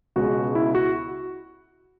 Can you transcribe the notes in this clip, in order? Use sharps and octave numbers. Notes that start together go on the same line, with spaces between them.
C#2 B2 G#3 C#4 F#4
E4
F#4